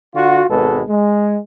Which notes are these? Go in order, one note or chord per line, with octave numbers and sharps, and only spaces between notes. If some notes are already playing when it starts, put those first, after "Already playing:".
D3 F4 F#4
G#1 B2 G#3 A4 B4
G#3